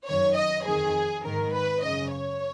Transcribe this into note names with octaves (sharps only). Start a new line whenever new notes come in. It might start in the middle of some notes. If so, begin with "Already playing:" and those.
F#2 D#3 C#5
D#5
F2 D#3 G#4
G#2 D#3 A#4
B4
F#2 C#3 D#5
C#5